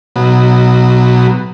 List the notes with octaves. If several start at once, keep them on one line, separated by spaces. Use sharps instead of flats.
B2 F#3